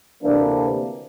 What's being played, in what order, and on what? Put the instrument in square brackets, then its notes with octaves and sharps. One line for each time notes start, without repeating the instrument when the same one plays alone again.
[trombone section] D2 C3 E3 A#3 D4